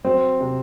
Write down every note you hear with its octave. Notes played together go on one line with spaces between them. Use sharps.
F#3 C4
C3